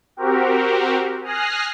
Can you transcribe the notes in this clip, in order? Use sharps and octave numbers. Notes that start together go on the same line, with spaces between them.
C4 F#4 G4 A#4
G#5 D#6 F6 F#6 A#6 C7